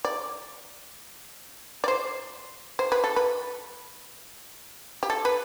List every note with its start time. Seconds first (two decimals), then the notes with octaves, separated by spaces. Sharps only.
0.05 D5
1.84 D5
1.88 C5
2.79 C5
2.92 B4
3.04 A4
3.16 B4
5.03 G4
5.10 A4
5.25 B4